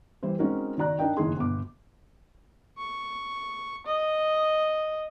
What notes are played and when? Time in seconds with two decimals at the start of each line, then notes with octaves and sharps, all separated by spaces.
0.23 E3 G3 E4 C5
0.39 G#3 C4 C#4 D#4 F#4 A#4
0.78 D#3 F#4 D5 A#5 F#6
0.99 D4 D#4 A#4 D#5 G5
1.17 F#1 D#3 D#4 E4 G#4 C6
1.37 G1 B2 D6
2.78 C#6
3.86 D#5